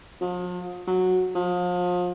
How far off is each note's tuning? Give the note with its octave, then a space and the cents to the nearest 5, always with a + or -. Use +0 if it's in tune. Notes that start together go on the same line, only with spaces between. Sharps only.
F3 +40
F#3 -10
F3 +35